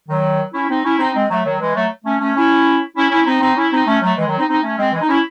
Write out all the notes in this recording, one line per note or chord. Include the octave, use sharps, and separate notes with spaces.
D#3 F#3
C#4 E4
C4 D#4
C#4 E4
C4 D#4
G#3 C4
F#3 A3
D#3 F#3
E3 G#3
F#3 A3
A3 C#4
A3 C#4
C#4 E4
C#4 E4
C#4 E4
C4 D#4
C4 D#4
C#4 E4
C4 D#4
A3 C#4
F#3 A3
E3 G#3
D#3 F#3
C4 D#4
C4 D#4
A3 C#4
G#3 C4
E3 G#3
D#4
C#4 E4